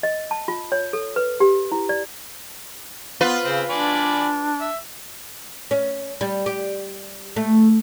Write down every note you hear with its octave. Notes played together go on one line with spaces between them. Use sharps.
D#5
A5
F4
C#5
A4
B4
G4
E4
D5
B3 F4 B4
C#3 C4
D4 D5 G#5 B5
E5
C#4
G3
G4
A3